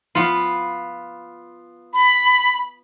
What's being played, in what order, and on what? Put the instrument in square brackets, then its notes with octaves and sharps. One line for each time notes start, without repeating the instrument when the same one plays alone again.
[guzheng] B3 F4
[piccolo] B5